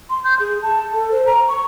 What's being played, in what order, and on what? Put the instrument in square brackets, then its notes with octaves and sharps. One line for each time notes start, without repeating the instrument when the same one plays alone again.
[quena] C6
G6
G#4
A5
A4
C5
A#5
C#6